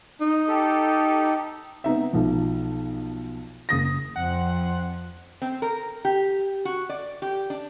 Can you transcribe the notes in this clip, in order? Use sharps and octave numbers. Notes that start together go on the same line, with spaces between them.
D#4
G4 A4
B3 C4 D#4 E5
B1 F3
F#1 D#6 A#6
F2 F3 C4 F#5
C4
A#4
G4
F#4
D5
G4
D4